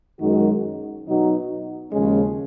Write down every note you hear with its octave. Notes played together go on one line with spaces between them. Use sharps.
F#2 D#3 G#3 D#4 F#4
B2 F#3 B3 D#4 F#4
D#2 C#3 F3 G#3 C#4